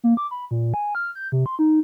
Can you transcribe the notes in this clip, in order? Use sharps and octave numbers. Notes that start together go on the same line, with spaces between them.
A#3
D6
B5
A#2
G#5
F6
G6
C3
C6
D#4